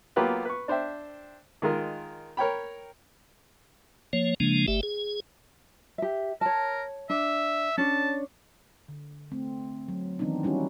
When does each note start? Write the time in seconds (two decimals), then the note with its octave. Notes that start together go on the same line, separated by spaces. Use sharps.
0.16 F#3 A#3 B3 F4 G4 B4
0.45 B4 C#6
0.68 D4 C5 E5 G5
1.62 D#3 G#3 F4 A#4
2.37 A#4 C#5 G5 B5
4.13 F3 A#3 C#5
4.40 C#3 F3 G#3 A#3 D4
4.68 G1 A3 G4 E5
4.83 G#4
5.98 G4 E5
6.41 A#4 C#5 A5
7.10 D4 E5
7.78 C#4 D4 A5
8.89 D3
9.32 A3 C4
9.88 F#3
10.19 D#3 E3 B3 C4 D4 D#4
10.43 G3 C#4 D#4 E4 F#4